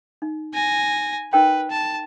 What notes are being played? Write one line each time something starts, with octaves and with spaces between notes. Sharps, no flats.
D#4
G#5 A#6
D#4 A#4 B4 G5
A5